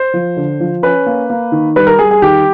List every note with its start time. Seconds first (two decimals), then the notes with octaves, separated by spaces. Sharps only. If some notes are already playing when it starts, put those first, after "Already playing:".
Already playing: C5
0.14 F3
0.37 D3
0.60 F3
0.83 C#4 B4
1.06 A#3
1.30 A#3
1.52 D#3
1.76 G3 B4
1.87 A#4
1.99 G3 G#4
2.11 G#4
2.22 D#3 G4